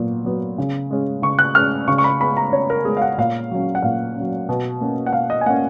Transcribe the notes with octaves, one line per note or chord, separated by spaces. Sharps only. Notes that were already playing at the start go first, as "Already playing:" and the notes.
Already playing: A#2 F#3 B3
F#3 B3
C#3
G#3 C#4
C#3 C#6
F#6
G#3 C#4 F6
C#3 C#6
C#6
B5
G#3 B3 B5
A#5
C#3 C#5
A#4
G#3 B3 G#4
F5
F#5
A#2 F5
F#3 C#4
F#5
A#2 F5
F#3 C#4
B2
A#3 C#4
F#5
B2 F5
D#5
G#5
A#3 C#4 F#5